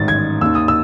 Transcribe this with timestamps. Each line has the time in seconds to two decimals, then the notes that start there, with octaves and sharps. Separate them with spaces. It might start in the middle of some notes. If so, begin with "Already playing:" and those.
Already playing: A1 G#2 D#3 A6
0.08 G#6
0.41 D#2 D#3 E6
0.55 D#6
0.68 E6